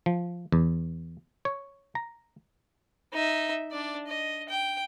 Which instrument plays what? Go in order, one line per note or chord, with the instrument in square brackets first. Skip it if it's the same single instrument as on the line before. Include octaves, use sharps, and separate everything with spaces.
[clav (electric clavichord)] F3
E2
C#5
A#5
[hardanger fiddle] D#4 E5
D4 D5
D#5
G5